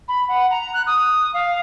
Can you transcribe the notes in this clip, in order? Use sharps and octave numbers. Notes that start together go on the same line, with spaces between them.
B5
F#5
A#5
F#6
D#6
F5